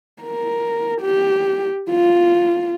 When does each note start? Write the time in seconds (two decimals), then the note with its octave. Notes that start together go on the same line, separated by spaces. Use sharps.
0.23 A#4
1.01 G4
1.90 F4